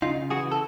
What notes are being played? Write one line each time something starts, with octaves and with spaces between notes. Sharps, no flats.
C#3 D#4 F4
E3 F#4 G#4
A4